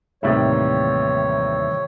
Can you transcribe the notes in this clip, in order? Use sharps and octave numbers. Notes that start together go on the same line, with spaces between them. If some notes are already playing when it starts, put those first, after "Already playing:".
D#2 A2 C3 D#3 E3 G3 C#5